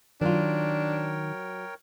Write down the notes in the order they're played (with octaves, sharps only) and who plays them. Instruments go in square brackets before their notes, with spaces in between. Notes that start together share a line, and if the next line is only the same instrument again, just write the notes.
[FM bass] D#3 [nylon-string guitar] F#3 F4 [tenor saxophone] D4 [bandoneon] A#4 C#5 G5